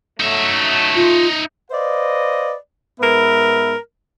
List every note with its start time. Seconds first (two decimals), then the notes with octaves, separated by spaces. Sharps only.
0.20 F#3 A3 D#4 E5
0.96 F4
1.71 B4 C5 D5 D#5 F5
3.00 G#2 B3 A#4 B4 E5